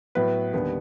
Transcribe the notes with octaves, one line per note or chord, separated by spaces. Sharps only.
A2 F#3 B3 B4
D#2 D3 G3 B3